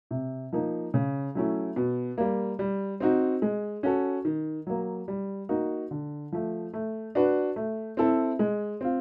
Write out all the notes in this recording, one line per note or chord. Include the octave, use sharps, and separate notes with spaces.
C3
F3 A#3 D#4
C#3
F#3 A3 C#4 E4
B2
G3 A#3
G3
C4 D#4 F#4
G#3
C#4 F#4 A4
D#3
F#3 A#3
G3
A#3 D#4 F#4
D3
F3 A3
A3
D4 F#4 B4
A3
C4 E4 A4
G#3
C4 F4